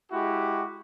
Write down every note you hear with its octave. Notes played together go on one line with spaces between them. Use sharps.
G#3 E4 F#4 G4